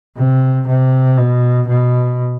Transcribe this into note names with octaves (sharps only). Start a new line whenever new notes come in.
C3
C3
B2
B2